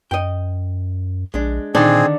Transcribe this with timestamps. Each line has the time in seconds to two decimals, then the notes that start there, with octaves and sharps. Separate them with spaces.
0.11 F#2 D#5 G5
1.34 A#1 G#3 D4
1.75 A#2 D3 D#3 C4 D4 D#4 G#4